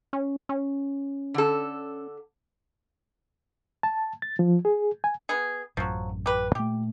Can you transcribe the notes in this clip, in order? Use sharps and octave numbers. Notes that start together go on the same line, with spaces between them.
C#4
C#4
D3 A4
A5
A6
F3
G#4
G#5
B3 G#4
A1 F#2 F3 F#3
G4 B4
A#2 A3 G4